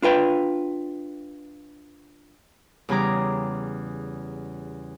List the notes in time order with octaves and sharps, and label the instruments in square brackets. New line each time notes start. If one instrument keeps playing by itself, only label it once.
[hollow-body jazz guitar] D4 F4 B4 G5
[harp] E2 C#3 G3 G#5 A#5 D6